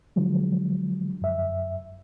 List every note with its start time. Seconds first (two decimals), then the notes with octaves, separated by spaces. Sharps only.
0.16 D3 F3 F#3 G#3
1.22 F#2 E5